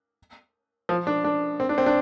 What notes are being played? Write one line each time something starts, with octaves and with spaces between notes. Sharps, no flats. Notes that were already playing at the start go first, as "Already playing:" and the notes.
F3
D4
D4
C4
D4
C4
D4